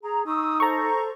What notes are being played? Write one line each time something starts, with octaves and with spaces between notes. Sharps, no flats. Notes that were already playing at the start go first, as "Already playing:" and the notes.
G#4 A#5
D#4 C#6 D#6 E6
A4 C5 A#5 C#6